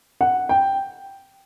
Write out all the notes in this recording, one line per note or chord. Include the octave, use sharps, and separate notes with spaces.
F#5
G5